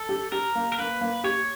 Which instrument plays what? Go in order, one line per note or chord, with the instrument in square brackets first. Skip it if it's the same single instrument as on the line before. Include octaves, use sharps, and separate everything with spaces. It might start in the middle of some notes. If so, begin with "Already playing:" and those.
Already playing: [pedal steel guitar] A4
[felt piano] G4
[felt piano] G4 [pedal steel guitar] A#4
[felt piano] A#3
[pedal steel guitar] A#4
[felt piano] A#3 [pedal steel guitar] B4
[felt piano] A#3
[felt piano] G4 [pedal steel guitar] C#5